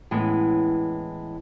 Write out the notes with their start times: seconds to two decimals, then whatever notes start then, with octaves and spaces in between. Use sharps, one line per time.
0.11 A2 E3 G#3 B3 C#4